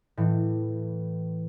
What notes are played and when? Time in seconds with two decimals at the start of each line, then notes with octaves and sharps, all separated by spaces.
0.17 A2 E3